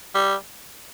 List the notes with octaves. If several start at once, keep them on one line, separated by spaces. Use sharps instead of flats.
G3